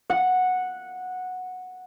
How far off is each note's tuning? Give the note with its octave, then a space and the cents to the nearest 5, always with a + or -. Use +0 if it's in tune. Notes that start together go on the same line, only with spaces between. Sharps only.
F#5 -10